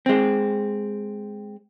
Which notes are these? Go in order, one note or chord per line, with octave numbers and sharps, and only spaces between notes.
G#3 C4